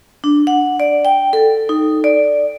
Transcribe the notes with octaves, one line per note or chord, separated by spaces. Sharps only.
D4
F#5
D5
G5
A4
D#4
D5